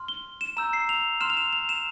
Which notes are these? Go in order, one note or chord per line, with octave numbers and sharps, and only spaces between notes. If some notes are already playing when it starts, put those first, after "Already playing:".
Already playing: C6 F6
G7
E7
A#5 E6 G6 E7
C7
F7
C6 F6 E7
F7
E7
F7
E7